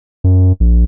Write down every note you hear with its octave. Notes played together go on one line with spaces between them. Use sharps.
F#2
A#1